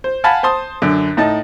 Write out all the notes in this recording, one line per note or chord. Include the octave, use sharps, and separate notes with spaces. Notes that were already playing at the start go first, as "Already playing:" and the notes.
C5
F5 F#5 G#5 A5 B5
C5 A5 C6 D#6
F#2 D3
A2 D#4 A5